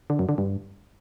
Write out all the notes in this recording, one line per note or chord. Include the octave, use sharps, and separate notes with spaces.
D3
F#2
D3
G2